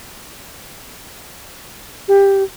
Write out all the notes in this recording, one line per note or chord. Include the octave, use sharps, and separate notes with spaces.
G4